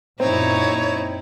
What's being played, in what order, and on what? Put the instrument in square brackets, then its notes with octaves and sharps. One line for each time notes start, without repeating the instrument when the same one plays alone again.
[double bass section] F#2 A#2 [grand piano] C4 [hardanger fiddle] D#4 E4 [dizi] C#5